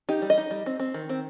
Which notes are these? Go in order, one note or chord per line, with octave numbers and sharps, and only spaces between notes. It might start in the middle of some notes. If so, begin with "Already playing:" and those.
D#4 G4
G3
D#5
D#4
G3
C4
C4
D#3
C4